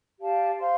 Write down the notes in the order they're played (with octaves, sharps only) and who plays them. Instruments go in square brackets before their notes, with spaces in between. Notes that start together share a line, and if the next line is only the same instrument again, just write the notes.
[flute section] G4 D5 F5 A5
C5 F5 C6